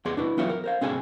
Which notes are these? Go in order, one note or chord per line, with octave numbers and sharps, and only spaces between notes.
E2 B3 G#4 D5 C6
D4 E4 B4
E3 F#3 B3 F4 C#5 E5
A#4
A#4 C5 F5
B1 C4 D4 G#4 A4 G#5